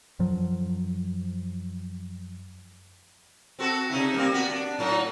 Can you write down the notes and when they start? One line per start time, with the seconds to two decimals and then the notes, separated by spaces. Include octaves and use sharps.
0.19 F#2 F3 F#3
3.59 C4 F#4 A4
3.90 C3 D#4 E4
4.14 G3 A#3 C4
4.32 B3 F#4
4.50 D4
4.79 A2 F#3 D#4